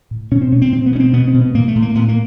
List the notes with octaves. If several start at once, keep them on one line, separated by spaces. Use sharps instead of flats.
A2
B2 C#4
C4
B2 C#4
C4
B2 C4
B3
B2 C#4
C4
B2 B3
C4
B2
B3
A2 A#3
A3
A2
A#3
A2 B3
A#3